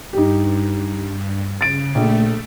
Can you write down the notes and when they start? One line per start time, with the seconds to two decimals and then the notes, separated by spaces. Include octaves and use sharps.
0.13 G2 D#4 G4
1.61 C#3 A6 D7
1.95 A#1 A3